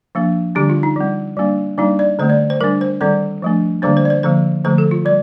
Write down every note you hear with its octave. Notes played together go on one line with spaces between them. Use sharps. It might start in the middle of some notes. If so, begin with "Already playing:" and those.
F3 A#3 D4
D3 G3 D4 G4
F4
D#4
G3 C4
G3 A#3 D4
G3 A#3 D4 D#4
D5
D3 A3 C4 C5
D5
C5
G3 D4 A#4
C5
D#3 G3 C4 D5
F3 A3 D4
D3 G3 A#3 D4 C5
C5
D5
C5
D3 F3 A#3 C5
D3 F3 A3 C5
A4
F4
G3 D5